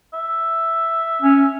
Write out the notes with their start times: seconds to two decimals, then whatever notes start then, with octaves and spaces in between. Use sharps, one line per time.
0.13 E5
1.22 C#4